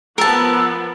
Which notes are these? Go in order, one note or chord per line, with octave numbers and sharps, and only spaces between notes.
F3 B3 A#4 A5 E6